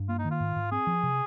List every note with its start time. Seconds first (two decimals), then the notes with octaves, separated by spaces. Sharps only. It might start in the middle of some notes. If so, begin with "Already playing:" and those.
Already playing: G2
0.09 A#3 F4
0.19 D#4
0.25 D#3
0.31 F4
0.40 G#2
0.56 G#2
0.72 C4 G#4
0.87 F3
1.03 C3